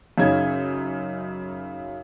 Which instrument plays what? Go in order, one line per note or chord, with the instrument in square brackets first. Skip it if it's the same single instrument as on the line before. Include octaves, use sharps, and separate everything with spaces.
[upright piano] F#2 C#3 D#4 G#6